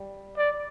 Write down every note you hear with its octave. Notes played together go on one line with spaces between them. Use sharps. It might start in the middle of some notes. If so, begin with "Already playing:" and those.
Already playing: G3
D5